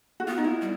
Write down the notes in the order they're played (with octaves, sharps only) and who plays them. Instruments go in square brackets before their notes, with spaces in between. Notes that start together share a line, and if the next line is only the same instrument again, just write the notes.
[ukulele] F#4
[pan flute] B3 [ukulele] F4
[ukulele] D#4
E4
[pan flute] G3